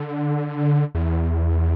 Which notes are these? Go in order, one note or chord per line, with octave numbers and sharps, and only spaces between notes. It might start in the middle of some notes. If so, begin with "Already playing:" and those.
Already playing: D3
E2